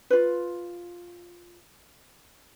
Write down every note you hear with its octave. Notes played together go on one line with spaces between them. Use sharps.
F4 B4